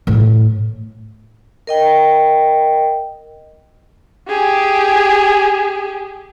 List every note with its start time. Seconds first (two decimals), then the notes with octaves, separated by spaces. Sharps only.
0.07 A2
1.67 A#4 D#5 G5
4.28 G4 G#4